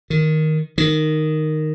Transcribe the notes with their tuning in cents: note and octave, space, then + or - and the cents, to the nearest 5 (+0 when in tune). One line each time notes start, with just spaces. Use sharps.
D#3 +5
D#3 -5